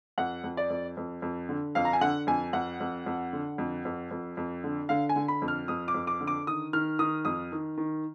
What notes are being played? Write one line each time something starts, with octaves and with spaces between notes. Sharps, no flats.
F2 F#5
F2
D5
F2
F2
F2
D3
F2 F5
A#5
G#5
D3 F#5
F2 G#5
F2 F#5
F2
F2
D3
F2
F2
F2
F2
D3
D3 F5
G#5
D3
B5
F2
F6
F2 D#6
D6
F2
D6
D3
D6
D#3 D#6
D#3 F6
D#3 D#6
F2 D#6
D#3
D#3